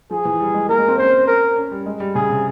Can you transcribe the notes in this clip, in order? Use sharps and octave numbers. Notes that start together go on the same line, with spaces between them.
F3 G#4
E3
G3
G#3
A#3 A#4
G#3
C4
C#4 C5
A#4
C#4
G3
G#3
G3
C#3 G#4
C3